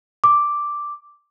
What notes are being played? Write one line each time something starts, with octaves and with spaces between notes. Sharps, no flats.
D6